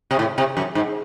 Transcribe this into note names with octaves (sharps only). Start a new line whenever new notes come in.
C3
A2
C3
F#2
G#2